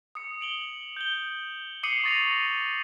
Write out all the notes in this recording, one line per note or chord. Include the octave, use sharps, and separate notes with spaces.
D#6 C#7
D7 F#7 G7
G6 G7
D6 D#6 C7 C#7 D#7 F#7
C#6 D#6 A6 A#6 D#7 F7